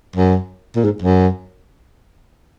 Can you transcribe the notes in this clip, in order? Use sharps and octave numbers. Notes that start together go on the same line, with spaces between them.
F#2
A#2
G#2
F#2